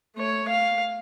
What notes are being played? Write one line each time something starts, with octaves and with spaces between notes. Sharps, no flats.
A3 C#5
F5